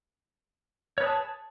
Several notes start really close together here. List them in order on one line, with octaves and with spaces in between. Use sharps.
C#5 B4 G#4 A5